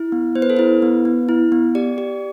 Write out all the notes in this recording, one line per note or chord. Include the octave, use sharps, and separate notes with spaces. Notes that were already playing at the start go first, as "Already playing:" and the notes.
Already playing: E4
B3
B3 C5
B4
A4
E4 B4
B3
B3
E4
B3
G4 D5
G4